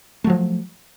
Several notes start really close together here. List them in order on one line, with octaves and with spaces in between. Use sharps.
A3 F#3 F3